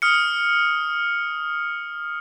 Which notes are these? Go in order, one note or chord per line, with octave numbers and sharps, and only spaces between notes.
D#6 F6 C#7